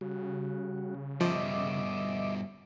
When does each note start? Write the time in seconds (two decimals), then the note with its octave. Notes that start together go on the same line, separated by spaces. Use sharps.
0.01 C#3 G3 F#4
1.21 G2 B2 F3 D#5 E5 D6